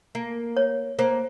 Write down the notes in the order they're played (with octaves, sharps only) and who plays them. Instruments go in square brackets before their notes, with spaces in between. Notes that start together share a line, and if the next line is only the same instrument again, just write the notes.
[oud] A#3
[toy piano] C#5
[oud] A#3 [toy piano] C5